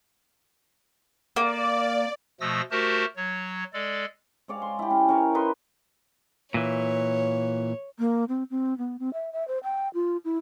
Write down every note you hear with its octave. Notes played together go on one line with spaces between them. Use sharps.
A#3 D5
B2 F3 A3 D#6 E6 A#6
A3 F#4 G4 A#4 C5 A5
F#3 C#5
G#3 A4 D5
G#3 C#5 D5 F5
C6
E4 G4
C#4
C#4 A#4 C#5
D#4 A#4 B4 C6
A#2 E3 C#5
A#3
C4
C4
B3
C4
E5
E5
C5
G5
F4
E4